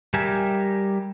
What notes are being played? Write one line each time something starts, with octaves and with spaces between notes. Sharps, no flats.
G3 G4 A#4 E5 G#5